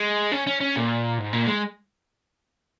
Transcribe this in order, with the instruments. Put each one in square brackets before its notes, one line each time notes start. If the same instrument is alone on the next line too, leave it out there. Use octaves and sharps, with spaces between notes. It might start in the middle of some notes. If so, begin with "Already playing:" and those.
Already playing: [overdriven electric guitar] G#3
C#4
C#4
C#4
A#2
G#2
A#2
G#3